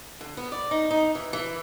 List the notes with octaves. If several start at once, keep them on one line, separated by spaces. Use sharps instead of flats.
D3
B3
D5
D#4
D#4
E3
E3